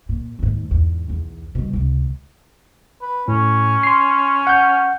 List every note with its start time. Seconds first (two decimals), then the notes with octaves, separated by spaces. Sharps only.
0.09 A#2
0.39 D#2 G#2
0.71 E2 G#2
1.09 B1 E2
1.55 B2 G3
1.73 C#2 C3
3.02 B4
3.28 A2 C#4
3.83 C6 C7
4.47 F#5 G6